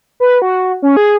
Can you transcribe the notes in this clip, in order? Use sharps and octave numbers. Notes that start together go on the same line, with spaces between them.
B4
F#4
C#4
G#4